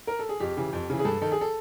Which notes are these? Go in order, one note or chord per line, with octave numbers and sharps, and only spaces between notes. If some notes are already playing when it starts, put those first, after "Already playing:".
A#4
A4
G#4
F2 G4
C#3 E3
F2
C#3 E3
G#4
G2 A4
D#3 A4
G#4
A4